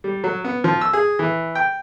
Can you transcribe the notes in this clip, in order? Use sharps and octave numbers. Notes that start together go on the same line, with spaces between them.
G3
F#3
B3
F3
E6
G#4
E3
G5